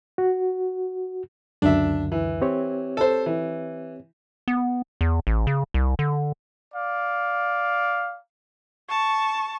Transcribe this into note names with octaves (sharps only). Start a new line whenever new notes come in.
F#4
C#2 F#2 D3 D4 E5
E3
C4 G4 C#5
A4 C5
E3
B3
E2
A1
C#3
C2
D3
D5 F5
A5 C#6